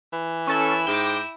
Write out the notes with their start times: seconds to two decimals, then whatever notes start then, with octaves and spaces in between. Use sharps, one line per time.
0.13 E3
0.47 C#4 E4 A4 E7
0.87 G#2 G5 D6 A#6